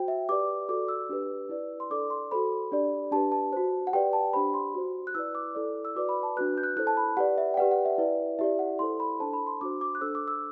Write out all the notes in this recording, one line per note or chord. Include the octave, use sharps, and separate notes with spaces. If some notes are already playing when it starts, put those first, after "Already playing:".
Already playing: F#4 C5 G5
E5
G4 B4 D5 D6
F#4 A4 D5 D6
E6
D4 G4 B4
E4 B4 D5
C6
D4 A4 D5 D6
C6
F#4 A4 C5 B5
D4 G4 D5
D4 G4 B4 A5
A5
F#4 C5
F#5
G4 B4 D5 G5
A5
D4 G4 C5 B5
C6
F#4 C5
F#6
E4 B4 D5 E6
D6
E4 A4 D5
E6
F#4 B4 D5 D6
B5
A5
D4 F#4 B4 F#6
G6
F#6
E4 A4 C5 F#6
A5
B5
G4 B4 D5 F#5
E5
G5
G4 B4 D5 F#5
F#5
E5
E4 B4 D5
E4 G4 D5 E5
F#5
E4 A4 C5 C6
B5
D4 A4 C5 A5
B5
C6
D4 F#4 C5 D6
D6
F#6
D4 A4 C5 E6
D6
E6